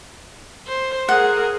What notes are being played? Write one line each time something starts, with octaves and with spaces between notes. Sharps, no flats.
C5
G#4 A#4 F#5